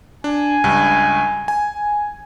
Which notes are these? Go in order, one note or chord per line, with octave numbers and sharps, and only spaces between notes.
D4 G#5
C#2 G2
G#5